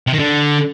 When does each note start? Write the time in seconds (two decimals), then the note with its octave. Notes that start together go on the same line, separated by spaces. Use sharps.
0.07 C3
0.13 D#3
0.19 D3